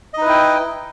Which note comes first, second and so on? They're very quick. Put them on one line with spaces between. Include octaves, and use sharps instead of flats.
D#5 D#4 B4 E4 G5